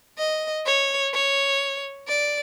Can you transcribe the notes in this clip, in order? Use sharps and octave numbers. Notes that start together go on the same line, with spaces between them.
D#5
C#5
C#5
D5